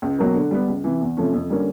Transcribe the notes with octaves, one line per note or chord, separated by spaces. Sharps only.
C#2
B2 F#3 A#3
D3
G3 B3
C#2
C3 E3
E2
C3 F3 A3 C#4
F2
D3 G3 A#3 C#4